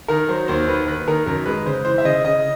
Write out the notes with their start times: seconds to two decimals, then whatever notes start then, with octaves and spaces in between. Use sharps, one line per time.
0.08 D#3 A#4
0.29 F#3 C5
0.48 D#2 C5
0.68 D#3 B4
0.87 D#3 B4
1.08 D#3 A#4
1.26 F#2 A#4
1.46 G#3 B4
1.66 C#3 C5
1.85 E3 C5
1.98 E5
2.05 C#3 D#5
2.25 C#3 D#5